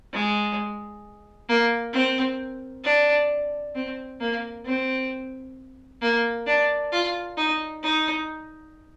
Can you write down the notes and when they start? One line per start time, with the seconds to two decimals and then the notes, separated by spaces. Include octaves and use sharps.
0.13 G#3
1.49 A#3
1.93 C4
2.85 D4
3.75 C4
4.20 A#3
4.66 C4
6.02 A#3
6.47 D4
6.92 F4
7.37 D#4
7.83 D#4